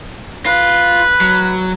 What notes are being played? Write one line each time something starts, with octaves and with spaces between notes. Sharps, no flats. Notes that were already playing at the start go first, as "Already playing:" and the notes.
F4 B4
F#3